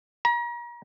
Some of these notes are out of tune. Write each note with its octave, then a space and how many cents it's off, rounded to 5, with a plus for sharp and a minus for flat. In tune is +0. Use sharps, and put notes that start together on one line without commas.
A#5 +40